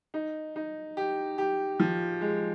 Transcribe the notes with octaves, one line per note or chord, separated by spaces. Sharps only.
D#4
D#4
G4
G4
F3
G#3